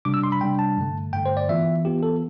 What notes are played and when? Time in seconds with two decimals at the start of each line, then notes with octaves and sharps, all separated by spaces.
0.05 C3 G3 D4 D6
0.14 E6
0.24 C6
0.32 B5
0.41 C3 G3 D4 G5
0.59 A5
0.77 G2 D3 A3
1.13 G2 D3 A3 G5
1.26 C5
1.37 D5
1.49 E3 B3 F4 E5
1.85 E3 B3 F4 G4
2.03 A4